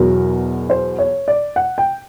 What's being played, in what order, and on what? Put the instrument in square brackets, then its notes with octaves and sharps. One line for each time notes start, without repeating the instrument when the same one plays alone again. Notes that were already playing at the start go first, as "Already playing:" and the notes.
Already playing: [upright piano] E2 B2 F#3 A#4
C5
C#5
D5
F#5
G5